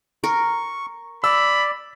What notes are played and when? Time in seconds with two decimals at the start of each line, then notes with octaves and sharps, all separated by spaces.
0.24 A#4 C#6
1.24 D5 B5 E6